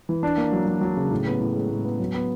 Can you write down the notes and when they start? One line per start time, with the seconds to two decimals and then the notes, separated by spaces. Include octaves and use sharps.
0.09 E3
0.23 D4
0.37 A#3
0.52 F#3
0.67 F#3
0.81 F#3
0.97 C#3
1.11 A2
1.27 B3
1.40 A2
1.55 G#3
1.71 A2
1.85 B3
2.00 F#3
2.14 B3